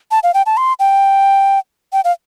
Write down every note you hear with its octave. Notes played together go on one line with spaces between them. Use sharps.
A5
F5
G5
A5
C6
G5
G5
F5